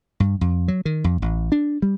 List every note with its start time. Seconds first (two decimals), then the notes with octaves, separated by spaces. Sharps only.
0.20 G2
0.41 F2
0.68 F#3
0.85 D#3
1.04 F2
1.22 A1
1.52 D4
1.82 G3